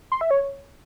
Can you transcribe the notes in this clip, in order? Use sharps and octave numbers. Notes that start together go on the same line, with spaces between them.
C6
E5
C#5